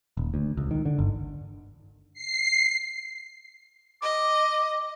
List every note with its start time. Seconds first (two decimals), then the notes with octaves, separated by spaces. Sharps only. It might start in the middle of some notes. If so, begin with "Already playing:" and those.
0.17 D#1
0.34 D2
0.57 C#2
0.71 D#3
0.85 D3
0.99 G1
2.14 C7
4.02 D#5 D6